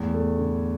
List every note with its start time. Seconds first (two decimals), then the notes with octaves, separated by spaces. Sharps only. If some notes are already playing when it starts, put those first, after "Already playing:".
Already playing: E2 A2
0.14 A3
0.39 D3